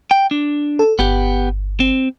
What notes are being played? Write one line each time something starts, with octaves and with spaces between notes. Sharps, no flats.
G5
D4
A4
G1 B3 G4
C4